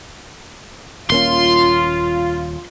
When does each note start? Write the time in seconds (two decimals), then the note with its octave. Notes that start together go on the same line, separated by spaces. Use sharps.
1.10 D#1 A#3 C#4 F4 C6